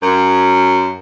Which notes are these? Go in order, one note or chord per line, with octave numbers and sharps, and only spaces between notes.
F#2